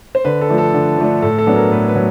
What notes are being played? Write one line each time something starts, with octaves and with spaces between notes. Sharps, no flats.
C5
D3 B4
A4
F3 A3 D4
A4
D3
F3 A3 D4
A2 A4
A4
F#3 B3 D4
A#4
A2 B4
B4
F#3